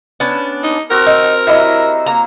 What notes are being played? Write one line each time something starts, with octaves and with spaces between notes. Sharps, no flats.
B3 C#4 D4
D#4
C4 F#4 A#4
D#4
F#3 G3 E4 D#5 E5
A#3 A#5